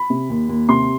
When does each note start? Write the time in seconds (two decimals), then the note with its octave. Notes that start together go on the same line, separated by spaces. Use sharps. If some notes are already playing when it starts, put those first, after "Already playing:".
Already playing: B5
0.10 C3
0.30 D#2
0.49 D#2
0.69 C3 C6